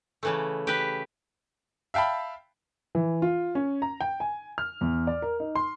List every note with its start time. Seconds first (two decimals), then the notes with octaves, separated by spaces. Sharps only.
0.23 C#3 E3 A3
0.67 G4 B4
1.94 E5 F5 G5 A5 B5
2.95 E3
3.22 F4
3.55 C#4
3.82 A#5
4.01 G5
4.20 G#5
4.58 F6
4.81 E2
5.07 D5
5.22 A#4
5.40 D#4
5.55 C6